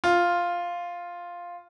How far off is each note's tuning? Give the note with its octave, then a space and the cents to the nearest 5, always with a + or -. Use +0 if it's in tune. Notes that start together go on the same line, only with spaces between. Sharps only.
F4 +0